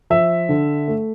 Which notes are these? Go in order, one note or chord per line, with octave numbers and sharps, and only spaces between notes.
F3 E5
D3
A3